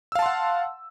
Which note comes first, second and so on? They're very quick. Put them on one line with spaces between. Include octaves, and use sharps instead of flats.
E6 F5 A5 C6 F#5